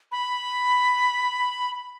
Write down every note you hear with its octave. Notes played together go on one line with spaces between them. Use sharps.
B5